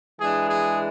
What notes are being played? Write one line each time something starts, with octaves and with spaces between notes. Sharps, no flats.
E3 G#3 D4 G#4
G#4